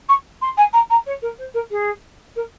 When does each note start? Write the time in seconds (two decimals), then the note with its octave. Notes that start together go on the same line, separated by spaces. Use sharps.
0.09 C#6
0.42 C6
0.57 G#5
0.73 A#5
0.90 A#5
1.06 C#5
1.22 A#4
1.38 C5
1.54 A#4
1.71 G#4
2.36 A#4